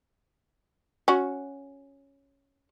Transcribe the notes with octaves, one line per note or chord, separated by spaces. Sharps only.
C#4 F#4